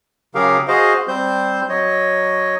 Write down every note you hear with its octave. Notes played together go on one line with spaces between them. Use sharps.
C#3 F#3 G4 G#4 A#4 F5
F#4 G#4 C5 D#5 F5
G3 C4 C5 G6
F#3 C#5 D#5